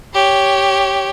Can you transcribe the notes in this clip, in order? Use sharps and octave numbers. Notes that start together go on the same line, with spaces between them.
G4 C#5